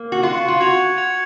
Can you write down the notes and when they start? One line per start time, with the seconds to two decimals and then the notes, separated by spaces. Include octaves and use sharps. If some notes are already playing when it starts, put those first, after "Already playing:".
Already playing: A#3
0.12 F#4
0.23 F4 C#6 F#6 C#7 F#7
0.48 F4
0.60 F#4 G#6 C#7 F7
0.98 G#6 C#7 F7